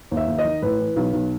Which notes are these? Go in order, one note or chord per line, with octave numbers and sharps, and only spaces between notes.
D#2
E5
D#2
D#5
D#3
A2 B4
E3
B1
B1